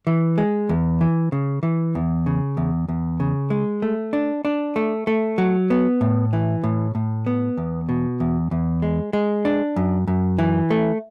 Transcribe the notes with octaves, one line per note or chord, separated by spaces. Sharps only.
E3
G#3
E2
E3
C#3
E3
E2
C#3
E2
E2
C#3
G#3
A3
D4
D4
A3
A3
F#3
B3
A2
E3
A2
A2
B3
E2
B2
E2
E2
G#3
G#3
D4
F#2
F#2
E3
A3